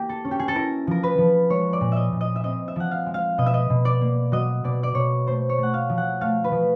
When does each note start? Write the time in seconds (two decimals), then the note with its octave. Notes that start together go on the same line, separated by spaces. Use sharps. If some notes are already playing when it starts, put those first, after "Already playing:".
Already playing: A#3 E4 G4
0.09 A4
0.25 C#4
0.31 G4
0.39 G#4
0.48 A4
0.55 E4 A#4
0.87 F3 A#4
1.03 B4
1.18 F3
1.50 G#3 C#5
1.73 D5
1.81 A#2
1.92 D#5 E5
2.12 A#2
2.21 D#5
2.36 E5
2.44 C4 D#5
2.68 E5
2.76 F3 F#5
2.91 F5
3.06 G#3
3.14 F5
3.38 B2 D#5
3.46 E5
3.54 D#5
3.70 B2
3.85 D5
4.01 A#3
4.32 F#3 D#5
4.64 B2 D5
4.83 D5
4.95 B2 C#5
5.27 A3 C5
5.49 C#5
5.58 A3
5.63 F#5
5.74 F5
5.89 F3
5.98 F#5
6.21 A3 F5
6.44 B4
6.51 F3